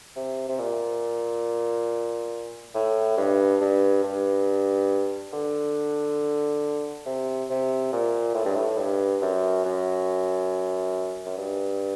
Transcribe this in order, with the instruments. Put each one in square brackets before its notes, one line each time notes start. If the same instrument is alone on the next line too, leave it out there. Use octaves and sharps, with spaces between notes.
[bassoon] C3
C3
A#2
A2
G2
G2
G2
D3
C3
C3
A#2
A2
G2
A2
G2
F#2
F#2
F#2
G2